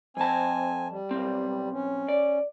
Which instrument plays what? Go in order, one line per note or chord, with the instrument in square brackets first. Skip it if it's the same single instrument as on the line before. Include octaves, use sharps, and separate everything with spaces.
[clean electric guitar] F2 A5 [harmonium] C4 G#5
[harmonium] G3
[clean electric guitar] B1 C4
[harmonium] C#4
[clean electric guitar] D5